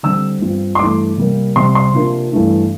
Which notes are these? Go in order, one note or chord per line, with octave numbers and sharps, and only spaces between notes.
D3 G3 C4 E6
G2 F3 C4
C6
G2 E3 A3 D4 D6
C3 G3 A#3
C3 G3 C4 C6
C6
C3 F3 A#3 D4
G2 E3 A3 D4